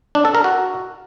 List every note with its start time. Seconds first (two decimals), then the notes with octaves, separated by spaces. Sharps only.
0.15 D4
0.25 A4
0.35 A#4
0.44 F#4